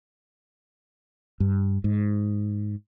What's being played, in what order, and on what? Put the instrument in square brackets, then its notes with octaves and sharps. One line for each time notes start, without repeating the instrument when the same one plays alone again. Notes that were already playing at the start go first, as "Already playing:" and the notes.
[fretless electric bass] G2
G#2